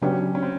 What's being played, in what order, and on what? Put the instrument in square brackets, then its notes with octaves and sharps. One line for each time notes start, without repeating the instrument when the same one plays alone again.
[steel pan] C#3 F#3 B3 D4 G4 [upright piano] C#4
[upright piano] C#4
C4